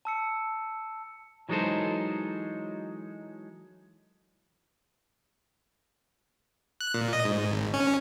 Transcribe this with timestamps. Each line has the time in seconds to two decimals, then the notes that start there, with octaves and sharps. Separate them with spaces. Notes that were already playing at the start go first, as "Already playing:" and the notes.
0.05 A5 E6 C#7
1.49 E3 F#3 G#3 D#4 A4 C5
6.81 F#6
6.94 A#2
7.13 D#5
7.25 G#2
7.53 G#1
7.74 C#4